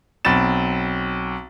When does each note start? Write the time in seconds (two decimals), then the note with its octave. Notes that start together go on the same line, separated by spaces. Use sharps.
0.25 B1 C4 B5 A6 E7